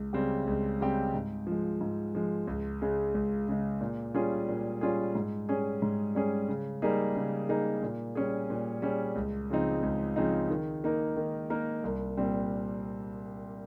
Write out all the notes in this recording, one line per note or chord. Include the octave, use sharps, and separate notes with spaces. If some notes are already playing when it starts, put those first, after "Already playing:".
Already playing: C#2
C#3 G3 C4 G4
C#2
C#3 G3 C4 G4
G#2
F3 G#3
G#2
F3 G#3
C#2
C#3 G#3
C#2
C#3 G#3
A#2
G3 C#4 F4 G#4
A#2
G3 C#4 F4 G#4
G#2
G3 C#4 G#4
G#2
G3 C#4 G#4
C#3
G3 A#3 D#4 G#4
C#3
G3 A#3 D#4 G#4
A#2
G3 C#4 G#4
A#2
G3 C#4 G#4
C#2
C#3 F3 C4 D#4
C#2
C#3 F3 C4 D#4
D#3
A#3 D#4 A#4
D#3
A#3 D#4 A#4
C2
A#2 G3 C4